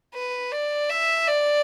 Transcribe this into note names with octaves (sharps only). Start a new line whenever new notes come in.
B4
D5
E5
D5